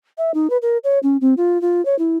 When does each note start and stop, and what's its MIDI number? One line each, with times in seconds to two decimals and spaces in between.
0.18 0.31 76
0.34 0.50 63
0.50 0.57 71
0.62 0.78 70
0.84 0.99 73
1.03 1.17 61
1.21 1.34 60
1.37 1.60 65
1.62 1.84 65
1.85 1.97 73
1.99 2.17 64